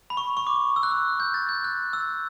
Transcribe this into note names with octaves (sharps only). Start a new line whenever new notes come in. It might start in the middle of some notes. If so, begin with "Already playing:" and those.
B5
C#6
C#6
D6
E6
F#6
E6
G6
A6
G6
F#6
E6